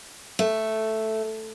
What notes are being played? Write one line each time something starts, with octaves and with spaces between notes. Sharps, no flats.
A3